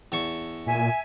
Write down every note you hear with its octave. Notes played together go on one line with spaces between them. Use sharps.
E2 A5 C#6
A#2 E5 G#5